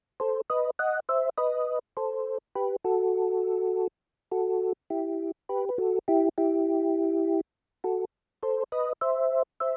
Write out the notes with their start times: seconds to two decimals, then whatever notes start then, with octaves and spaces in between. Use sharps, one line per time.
0.20 A4 C5
0.50 B4 D#5
0.79 D#5 F#5
1.09 C5 E5
1.38 B4 D#5
1.97 A4 C5
2.55 G4 B4
2.85 F#4 A4
4.31 F#4 A4
4.90 E4 G4
5.49 G4 B4
5.69 B4
5.78 F#4 A4
6.08 E4 G4
6.38 E4 G4
7.84 F#4 A4
8.43 A4 C5
8.72 B4 D#5
9.01 C5 E5
9.60 C5 E5